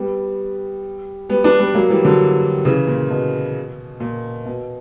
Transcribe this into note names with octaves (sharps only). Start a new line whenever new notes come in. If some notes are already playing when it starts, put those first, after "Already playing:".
Already playing: G3 B3
G3 B3
B3 D4
G3 B3
F#3 A#3
E3 G3
D3 F#3
C#3 E3
A#2
B2
A#2
B2